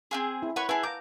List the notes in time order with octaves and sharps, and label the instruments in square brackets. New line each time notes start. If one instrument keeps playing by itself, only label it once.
[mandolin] C4 F4 G#4
[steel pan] E4
[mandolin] B4 C#5 C#6 [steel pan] F#5
[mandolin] E4 G#4 [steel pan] B4 G#5 A5
[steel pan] F5 A#5 D6 [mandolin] G6